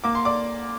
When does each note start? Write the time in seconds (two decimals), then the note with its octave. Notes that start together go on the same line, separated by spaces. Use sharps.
0.04 A#3 D6
0.15 C6
0.25 D5 D6